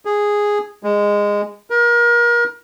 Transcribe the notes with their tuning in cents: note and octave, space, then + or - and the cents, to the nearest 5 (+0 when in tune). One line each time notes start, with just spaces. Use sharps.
G#4 -5
G#3 -15
A#4 +35